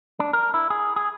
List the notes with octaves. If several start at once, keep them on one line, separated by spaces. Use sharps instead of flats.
D4
A#4
E4
G#4
G#4